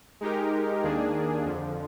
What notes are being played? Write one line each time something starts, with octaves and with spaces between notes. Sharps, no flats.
G#3 D#4 G4 A#4
D#2 D#3 A#3 D4 G#4
F2 D3 F3